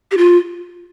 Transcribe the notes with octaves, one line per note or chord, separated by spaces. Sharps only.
G4
F4